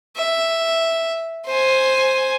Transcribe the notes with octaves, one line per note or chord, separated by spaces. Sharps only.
E5
C5 G#5